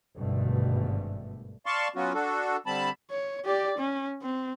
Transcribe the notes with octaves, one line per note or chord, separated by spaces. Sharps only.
G#1 G2 B2 D3 A3
D5 F5 A5 C6 C#6
F#3 B3 C#4 F4 F#4
D4 F#4 A4
D3 G3 C4 A5 B5
C#5
G4 D5
C#4
C4